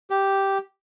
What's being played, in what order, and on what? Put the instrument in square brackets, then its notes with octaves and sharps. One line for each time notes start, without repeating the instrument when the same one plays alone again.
[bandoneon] G4